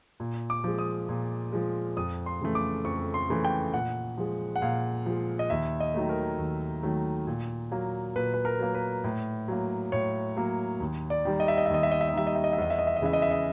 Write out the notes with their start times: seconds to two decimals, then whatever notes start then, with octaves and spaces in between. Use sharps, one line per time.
0.20 A#2
0.50 D6
0.64 F3 G#3
0.79 D#6
1.09 A#2
1.52 F3 G#3
1.97 F2 D#6
2.26 C6
2.41 C#3 E3 A3
2.55 D6
2.85 F2 C#6
3.14 C6
3.30 C#3 E3 A3
3.45 G5
3.73 A#2 F#5
4.17 F3 G#3
4.56 F#5
4.62 A#2 F5
5.06 F3 G#3
5.39 D#5
5.50 D#2 E5
5.80 D#5
5.94 D#3 F#3 A3
6.09 A#4
6.38 D#2
6.83 D#3 F#3 A3
7.27 A#2
7.72 F#3 A#3
8.16 A#2 B4
8.34 B4
8.45 A#4
8.59 F#3 A#3
8.75 B4
9.04 A2
9.48 F#3 A#3
9.92 A2 C#5
10.37 F#3 A#3
10.80 D#2
11.10 D5
11.25 D#3 G3
11.40 D#5
11.48 E5
11.58 D#5
11.66 E5
11.70 D#2 D#5
11.83 E5
11.91 D#5
12.01 E5
12.09 D#5
12.14 D#3 G3 E5
12.27 D#5
12.35 E5
12.44 D#5
12.53 E5
12.58 E2 D#5
12.70 E5
12.79 D#5
12.87 E5
12.96 D#5
13.02 C#3 E3 G#3 E5
13.13 D#5
13.22 E5
13.31 D#5